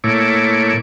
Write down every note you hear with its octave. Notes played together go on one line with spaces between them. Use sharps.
A#2 A3 E4 C#5 D6